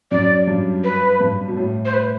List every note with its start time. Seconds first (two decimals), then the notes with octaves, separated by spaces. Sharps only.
0.11 F#2 D5
0.47 G2
0.84 B4
1.21 G2
1.48 B2
1.57 A2
1.85 C5
1.94 B4